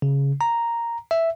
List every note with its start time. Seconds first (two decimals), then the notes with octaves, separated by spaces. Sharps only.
0.02 C#3
0.41 A#5
1.11 E5